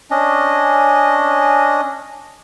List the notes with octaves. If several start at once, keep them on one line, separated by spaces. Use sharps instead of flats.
C#4 D4 D#5